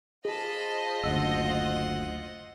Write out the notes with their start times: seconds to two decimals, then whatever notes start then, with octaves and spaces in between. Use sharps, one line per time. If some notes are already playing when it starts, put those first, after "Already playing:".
0.25 F4 G#4 C5 D#5 A5 B5
1.04 F#1 D2 F#5 E6